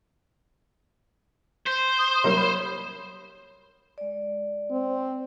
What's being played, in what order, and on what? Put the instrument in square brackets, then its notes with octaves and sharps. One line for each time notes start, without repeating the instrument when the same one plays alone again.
[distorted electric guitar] C5 [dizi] G6
[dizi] D#6
[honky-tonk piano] F#3 G3 A#3 [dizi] C#5
[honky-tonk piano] B5 G6
[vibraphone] G#3 D5
[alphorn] C4